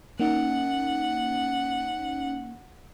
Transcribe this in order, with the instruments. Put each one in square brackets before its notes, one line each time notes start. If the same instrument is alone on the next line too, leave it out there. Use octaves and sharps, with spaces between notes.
[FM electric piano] A#3 D#4 [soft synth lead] C#4 [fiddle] F#5